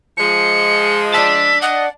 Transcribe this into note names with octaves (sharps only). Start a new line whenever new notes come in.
F3 G#3 C#7
D5 A5 E6 B6
D#5 F#5